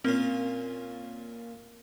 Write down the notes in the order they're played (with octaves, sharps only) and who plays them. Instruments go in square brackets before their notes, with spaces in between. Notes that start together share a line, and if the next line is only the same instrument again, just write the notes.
[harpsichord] A#2 C#4 [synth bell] C4